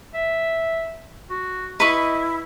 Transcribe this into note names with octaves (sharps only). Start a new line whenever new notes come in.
E5
F#4
E4 B4 D#5 B5 C#6